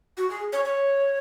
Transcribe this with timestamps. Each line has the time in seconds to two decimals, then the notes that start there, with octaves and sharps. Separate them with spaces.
0.17 F#4
0.30 G#4
0.53 C#5
0.65 C#5